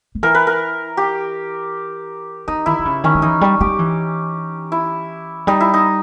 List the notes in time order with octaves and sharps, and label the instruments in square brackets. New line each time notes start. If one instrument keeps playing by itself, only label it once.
[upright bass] D#3
[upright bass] E3 [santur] A#4
[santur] B4
A#4
G4
[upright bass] E3 [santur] D#4
[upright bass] D#3 [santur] E4
[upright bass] D#3
C#3
[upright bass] D#3 [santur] C#4
[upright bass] G3
[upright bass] E3 [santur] D#4
[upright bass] G3
[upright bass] G3 [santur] G4
[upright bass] E3
[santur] E4
[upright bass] G3 [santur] D#4
[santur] E4
D#4